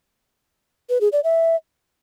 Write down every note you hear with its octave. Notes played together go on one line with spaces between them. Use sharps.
B4
G#4
D5
E5